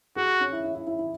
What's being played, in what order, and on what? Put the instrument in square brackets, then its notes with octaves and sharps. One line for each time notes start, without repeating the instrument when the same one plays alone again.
[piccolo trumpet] F#4 [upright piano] G#4
[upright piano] C#4
E4
E4
E4
E4
E4